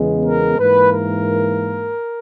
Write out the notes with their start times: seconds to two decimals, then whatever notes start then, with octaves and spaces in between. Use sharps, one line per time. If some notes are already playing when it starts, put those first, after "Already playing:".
Already playing: E2 C#3 G#3 B3
0.25 A#4
0.59 G#2 E3 A#3 B4
0.92 A#4